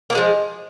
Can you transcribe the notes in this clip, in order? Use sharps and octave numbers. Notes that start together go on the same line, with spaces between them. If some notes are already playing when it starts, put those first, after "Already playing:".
F3 G#3 A#3 G#4